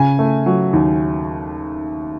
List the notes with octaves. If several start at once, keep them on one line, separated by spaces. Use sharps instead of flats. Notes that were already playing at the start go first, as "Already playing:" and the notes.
Already playing: C#3 G#5
A3
F#3
D#2